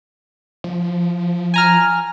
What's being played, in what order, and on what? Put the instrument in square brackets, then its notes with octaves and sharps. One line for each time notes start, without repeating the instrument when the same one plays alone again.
[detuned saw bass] F3
[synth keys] G#5 A#5 F6